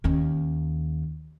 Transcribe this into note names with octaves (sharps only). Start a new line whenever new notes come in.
D#2 C#4